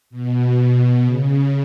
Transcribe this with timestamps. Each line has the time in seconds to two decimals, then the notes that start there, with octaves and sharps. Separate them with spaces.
0.10 B2
0.59 B2
1.05 C#3